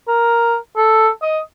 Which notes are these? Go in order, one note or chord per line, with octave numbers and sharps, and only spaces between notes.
A#4
A4
D#5